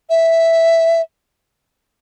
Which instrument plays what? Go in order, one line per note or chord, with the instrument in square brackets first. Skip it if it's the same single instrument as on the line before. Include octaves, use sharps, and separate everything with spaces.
[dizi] E5